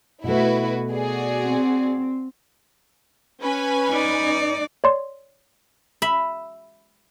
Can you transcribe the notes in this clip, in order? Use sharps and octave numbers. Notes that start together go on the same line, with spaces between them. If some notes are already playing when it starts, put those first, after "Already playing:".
B2 A3 E4 F#4 B4
F#4 G#4 D5
C4
C#4 B4 G#5
D#4 D5
C#5 D5 C6
E5 B5